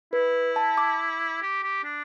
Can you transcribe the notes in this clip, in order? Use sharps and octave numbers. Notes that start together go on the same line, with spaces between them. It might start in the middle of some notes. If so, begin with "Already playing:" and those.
E4 B4
A5
D6
G4
G4
D4